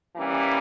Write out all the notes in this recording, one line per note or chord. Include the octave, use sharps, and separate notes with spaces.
E3 G3 A#3 C#4